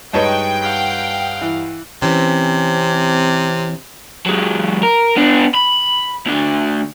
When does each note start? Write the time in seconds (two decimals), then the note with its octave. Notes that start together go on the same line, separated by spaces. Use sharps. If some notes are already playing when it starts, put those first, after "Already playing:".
0.13 G2 G#3 D#4 B4 C#5 G5 A5 C#6
0.62 F5 F#5
1.41 E3
2.02 C3 E3 C4 C#4
4.26 F#3 G#3
4.83 A#4
5.16 B3 D4
5.54 B5
6.26 D2 D3